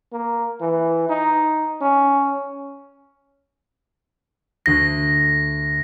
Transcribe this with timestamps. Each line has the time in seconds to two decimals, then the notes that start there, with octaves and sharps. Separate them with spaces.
0.12 A#3
0.61 E3
1.09 D#4
1.81 C#4
4.66 D2 A#6 C7